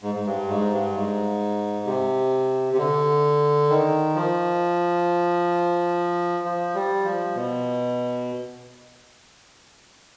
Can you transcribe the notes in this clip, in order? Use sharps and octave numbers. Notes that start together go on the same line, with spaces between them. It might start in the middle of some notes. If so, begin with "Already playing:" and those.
G#2
G#2
G2
G#2
G2
G#2
C3
C3
D3
D#3
F3
F3
G3
F3
B2